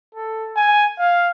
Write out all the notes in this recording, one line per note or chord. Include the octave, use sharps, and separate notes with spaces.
A4
G#5
F5